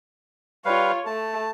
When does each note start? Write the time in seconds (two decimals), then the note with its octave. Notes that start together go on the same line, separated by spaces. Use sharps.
0.65 G3 F4 B4 C#5 F5
1.06 A3 A5